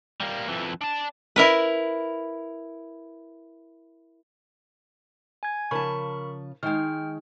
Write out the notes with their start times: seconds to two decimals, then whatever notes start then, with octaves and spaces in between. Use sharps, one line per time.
0.20 G3 A#3
0.48 F2 E3
0.81 D4 A5
1.36 E4 A#4 B4
5.43 G#5 G#6
5.71 C#3 F3 A#4 A5 B5 C#6
6.63 D#3 G#3 G5 F6